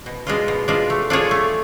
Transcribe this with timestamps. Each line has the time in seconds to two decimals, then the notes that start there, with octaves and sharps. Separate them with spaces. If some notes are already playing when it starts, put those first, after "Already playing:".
0.06 B2
0.27 G#3 D4 F4
0.48 B2
0.68 G#3 D4 F4
0.90 A3
1.10 D4 F4 G#4 C#5
1.31 A3